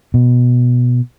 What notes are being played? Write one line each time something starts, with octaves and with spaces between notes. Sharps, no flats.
B2